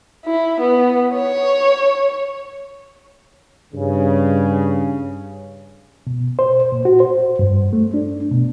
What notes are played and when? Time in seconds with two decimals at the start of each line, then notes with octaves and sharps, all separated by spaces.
0.25 E4
0.61 B3
1.14 C#5
3.73 G2 C#3
6.07 B2
6.39 C5
6.72 A#2
6.85 F#4
7.00 C5
7.39 G2
7.73 A3
7.94 D4
8.31 B2